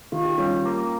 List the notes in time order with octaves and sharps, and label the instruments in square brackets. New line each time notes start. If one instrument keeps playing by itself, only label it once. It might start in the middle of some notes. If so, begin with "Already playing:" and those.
[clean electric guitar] D#3 [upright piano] F4
[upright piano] G4
[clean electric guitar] G3 [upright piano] C#4 F4
[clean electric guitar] A#3